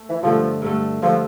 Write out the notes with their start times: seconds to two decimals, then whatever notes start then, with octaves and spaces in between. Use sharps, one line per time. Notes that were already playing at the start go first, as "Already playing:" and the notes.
Already playing: A3
0.10 E3
0.23 G2 D3 F3 A3
0.62 G2 D3 A3
1.02 G2 D3 F3 A3